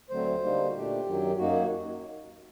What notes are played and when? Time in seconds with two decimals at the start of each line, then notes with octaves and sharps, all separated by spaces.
0.10 D2 D3 F#3 A3 C4 C5
0.42 D3 G3 A#3 D#4
0.68 F#4
0.74 A#2 A3 D4 G4
1.06 F#2 D#3 F#3
1.38 F#2 F#3 A#3 D#4 F#4